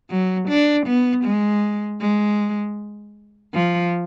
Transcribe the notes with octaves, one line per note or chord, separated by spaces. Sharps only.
F#3
D4
B3
G#3
G#3
F3